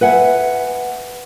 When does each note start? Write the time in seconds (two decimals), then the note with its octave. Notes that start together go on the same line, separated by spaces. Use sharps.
0.01 B4 E5 F#5 G#5